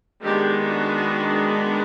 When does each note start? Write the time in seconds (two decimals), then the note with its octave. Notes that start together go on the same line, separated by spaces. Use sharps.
0.22 D#3 G#3 B3 D4 G4
0.68 F#4